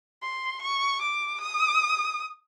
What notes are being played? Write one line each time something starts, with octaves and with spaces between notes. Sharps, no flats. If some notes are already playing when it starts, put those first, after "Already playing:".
C6
C#6
D6
D#6